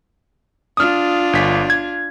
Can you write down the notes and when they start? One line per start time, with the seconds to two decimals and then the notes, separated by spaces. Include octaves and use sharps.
0.77 D4 F4 D#6 F6
1.33 G1 B6
1.70 G#6